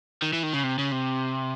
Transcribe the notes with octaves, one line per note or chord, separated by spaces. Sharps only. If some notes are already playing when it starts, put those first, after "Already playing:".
D#3
E3
D#3
C#3
C3
C#3
C3